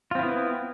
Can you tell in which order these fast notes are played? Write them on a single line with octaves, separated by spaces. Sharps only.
F4 C4 E4 B3